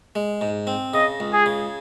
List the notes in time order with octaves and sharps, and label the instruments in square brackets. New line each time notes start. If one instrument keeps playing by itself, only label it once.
[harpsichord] G#3
G#2
C4
[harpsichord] C#3 [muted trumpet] D#5
[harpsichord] C#2
[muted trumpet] G#4
[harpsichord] C#3